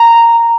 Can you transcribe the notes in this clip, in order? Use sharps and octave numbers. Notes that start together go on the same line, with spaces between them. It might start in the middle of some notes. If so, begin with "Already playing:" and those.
Already playing: A#5